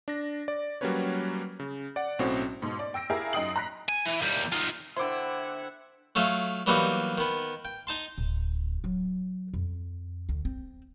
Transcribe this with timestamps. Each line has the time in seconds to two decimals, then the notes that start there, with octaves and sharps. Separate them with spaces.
0.08 D4 A#6
0.48 D5
0.81 F#3 G3 A#3 C#4 B4 C#5
1.60 C#3
1.96 D5 F#5
2.19 B1 A2 C4 C#4 F#4
2.62 G#2 B2
2.79 D5
2.94 G5 E6 A#6 D7
3.10 E4 G4 G#4 A#4 F5
3.33 F#2 D#4 G5 D#6 C7 F#7
3.56 A#5 B5 F#6 A#6 B6
3.89 G#5
4.06 E3
4.22 D#2 G3
4.52 D#4 F4
4.97 D3 E4 C5 E5 F#5 G5 C6 D6
6.15 F#3 A3 F4 E5 G#5
6.66 E3 F#3 G3 A#3 B3 D#4
7.18 D#3 B3
7.65 G5
7.87 D#4 A5 C6
8.18 D1
8.84 F#3
9.54 F2
10.29 D2
10.45 C4